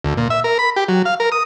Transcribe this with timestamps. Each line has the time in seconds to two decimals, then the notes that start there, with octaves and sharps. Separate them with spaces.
0.05 D2
0.17 A#2
0.30 E5
0.44 A#4
0.59 B5
0.76 G4
0.89 F#3
1.05 F5
1.20 A#4
1.32 D#6